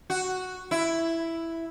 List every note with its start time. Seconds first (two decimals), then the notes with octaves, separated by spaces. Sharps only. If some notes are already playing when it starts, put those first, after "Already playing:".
0.10 F#4
0.71 E4